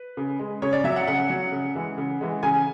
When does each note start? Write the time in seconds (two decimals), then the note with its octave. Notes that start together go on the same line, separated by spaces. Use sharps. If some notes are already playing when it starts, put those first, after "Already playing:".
Already playing: B4
0.17 C#3
0.39 G#3
0.62 C#3 C#5
0.73 D5
0.84 F#3 E5
0.96 F#5
1.07 C#3 F#5
1.30 F#3
1.52 C#3
1.75 E3 G#3
1.98 C#3
2.21 E3 G#3
2.43 C#3 G#5